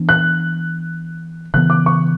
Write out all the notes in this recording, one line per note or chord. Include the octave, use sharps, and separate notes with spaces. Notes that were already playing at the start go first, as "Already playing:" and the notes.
Already playing: E3 B3 D4
F#6
C#3 E3 B3 F#6
D6
C#6